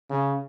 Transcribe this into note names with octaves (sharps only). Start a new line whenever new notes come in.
C#3